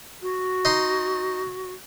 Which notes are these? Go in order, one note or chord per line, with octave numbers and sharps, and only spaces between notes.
F#4
D#4 C6